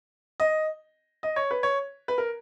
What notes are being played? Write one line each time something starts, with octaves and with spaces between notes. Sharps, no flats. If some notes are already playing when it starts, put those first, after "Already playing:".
D#5
D#5
C#5
B4
C#5
B4
A#4